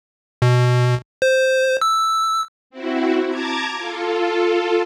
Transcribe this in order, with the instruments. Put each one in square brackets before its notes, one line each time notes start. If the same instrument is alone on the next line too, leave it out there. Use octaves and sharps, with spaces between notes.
[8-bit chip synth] B2
C5
E6
[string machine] C4 E4 F#4
A5 A#5 D6 G#6
F4 A4